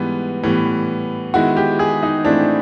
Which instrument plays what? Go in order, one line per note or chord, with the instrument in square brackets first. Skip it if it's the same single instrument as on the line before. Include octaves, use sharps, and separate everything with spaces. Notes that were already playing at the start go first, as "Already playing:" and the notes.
Already playing: [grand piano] G#2 E3 G3 B3
A2 E3 G3 B3
[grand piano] D#3 G#3 B3 E4 [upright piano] F#4
[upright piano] G4
G#4
D#4
[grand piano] A2 E3 A3 C4 E4 [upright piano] D4